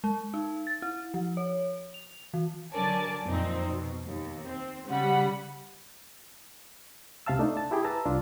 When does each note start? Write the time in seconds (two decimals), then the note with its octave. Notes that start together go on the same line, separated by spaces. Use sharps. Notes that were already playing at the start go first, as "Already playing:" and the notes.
0.04 G#3
0.34 D#4
0.67 A6
0.82 E4
1.14 F3
1.37 C#5
1.94 F7
2.34 E3
2.73 D3 F#3 A#4 D5 G#5 A5
3.25 F2 A#2 C4 D#4
3.67 B2
4.06 D#2
4.45 C4
4.87 C#3 G3 F#5 B5
7.26 C#2 C3 E5 F5 A5 E6
7.39 A3 D4 D#4
7.57 A5
7.71 E4 G4 G#4 G5
7.85 B4 A5 A#5 E6
8.05 C2 D4 F4